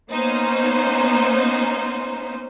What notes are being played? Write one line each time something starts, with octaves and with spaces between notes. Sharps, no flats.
A#3 B3 C#4 D#4 C5